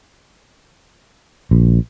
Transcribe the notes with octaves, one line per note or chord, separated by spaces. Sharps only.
A#1